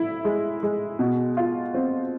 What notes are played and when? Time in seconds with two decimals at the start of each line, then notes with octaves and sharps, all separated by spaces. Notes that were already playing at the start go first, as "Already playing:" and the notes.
Already playing: E4
0.25 G#3
0.63 G#3
0.99 B2
1.37 F4
1.74 C4